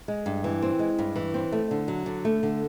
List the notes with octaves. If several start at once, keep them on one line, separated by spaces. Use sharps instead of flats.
G#3
G2
E3
C4
G#3
G2
E3
C4
A3
D3
F#3
D3
A3
D3